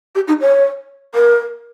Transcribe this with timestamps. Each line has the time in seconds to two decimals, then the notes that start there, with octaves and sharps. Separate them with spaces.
0.15 G4
0.28 D#4
0.41 C#5
1.14 A#4